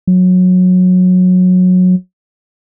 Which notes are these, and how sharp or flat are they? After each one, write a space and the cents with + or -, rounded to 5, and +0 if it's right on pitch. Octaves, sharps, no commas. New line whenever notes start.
F#3 -20